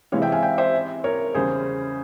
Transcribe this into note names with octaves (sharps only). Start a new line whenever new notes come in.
C3 E3 G#3 E4 C#5 F5
E5 G5
F5 G#5
E5 G5
C5 E5
A#4 C#5
E2 C#3 G3 C#4 G#4 C5